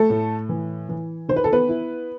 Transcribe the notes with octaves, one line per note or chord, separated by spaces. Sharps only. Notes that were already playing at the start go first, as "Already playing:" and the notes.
Already playing: A3 A4
A2
E3
E3
D#3 C5
B4
A4
B3 B4
E4